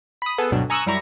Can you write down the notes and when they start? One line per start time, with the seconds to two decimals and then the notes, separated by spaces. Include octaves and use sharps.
0.22 B5 D#6
0.38 B3 G#4 A4
0.51 D2 G2 B2 F#3 D4
0.70 G#5 A#5 C#6 D#6 E6 F#6
0.86 F#2 G3 E4 A#5 C#6